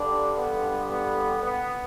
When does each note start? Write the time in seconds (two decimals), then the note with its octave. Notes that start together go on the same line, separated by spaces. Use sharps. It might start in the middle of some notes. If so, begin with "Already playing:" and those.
Already playing: G2 D3 G3 D4
0.34 B3
0.88 B3
1.42 B3